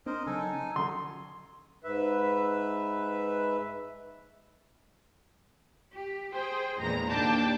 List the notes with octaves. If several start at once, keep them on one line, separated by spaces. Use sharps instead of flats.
C4 D4 A#4 C5 D#5
C#3 F#3 D#4 A4 G#5
C#4
D3 F#3 C6
G#2 B4 E5
G4
G#4 C5 G5
A#1 E2 A#2 G#3 A#5
D#2 A#3 D4 G5 A5 D6